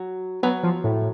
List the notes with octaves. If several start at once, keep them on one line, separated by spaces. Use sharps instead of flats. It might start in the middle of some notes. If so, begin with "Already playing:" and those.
Already playing: F#3
F#3 B3
F3
A2